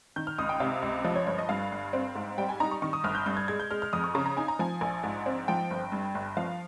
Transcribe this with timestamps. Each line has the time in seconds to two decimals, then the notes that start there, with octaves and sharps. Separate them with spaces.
0.16 D#3 G6
0.27 F6
0.38 C#2 D#6
0.49 G5
0.60 C3 F5
0.82 C#2
1.04 F3 D#5
1.16 C#5
1.27 G1 C#5
1.38 D#5
1.49 G2 F5
1.72 G1
1.93 C4
2.15 G#2
2.38 G3 G5
2.49 G#5
2.60 D#4 A#5
2.71 C#6
2.82 D#3 C#6
2.93 D#6
3.04 G1 F6
3.15 G6
3.26 G2 G6
3.37 G#6
3.48 G#3 G#6
3.59 G6
3.71 G#3 F6
3.82 F6
3.93 F2 D#6
4.04 C#6
4.15 C#3 A#5
4.26 A#5
4.37 D#4 G#5
4.48 A#5
4.59 F3 G#5
4.81 A#1
5.03 G#2
5.26 C4
5.48 F3 G5
5.70 G1
5.92 G2
6.15 G1
6.37 F3 F5